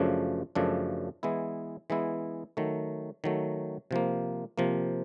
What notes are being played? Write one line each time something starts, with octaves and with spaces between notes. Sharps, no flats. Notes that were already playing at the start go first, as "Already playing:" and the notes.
Already playing: F#2 C#3 F3 A3 D4
F#2 C#3 F3 A3 D4
E3 G#3 B3 E4
E3 G#3 B3 E4
D#3 F#3 A3
D#3 F#3 A3
C3 F3 A#3
C3 F3 A#3